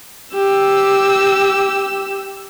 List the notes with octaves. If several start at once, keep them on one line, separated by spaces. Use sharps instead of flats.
G4 E6